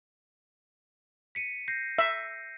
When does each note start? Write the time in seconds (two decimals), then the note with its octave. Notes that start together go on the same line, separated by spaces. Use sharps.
1.35 B6 C#7 D#7
1.68 G6 A#6 C7
1.98 E5